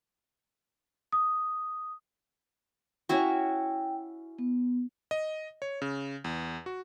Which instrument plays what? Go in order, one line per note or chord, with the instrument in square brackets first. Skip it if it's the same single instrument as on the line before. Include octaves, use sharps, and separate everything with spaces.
[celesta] D#6
[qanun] C#4 E4 F#4 [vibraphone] G5
[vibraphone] B3
[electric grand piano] D#5
C#5
C#3
E2
F#4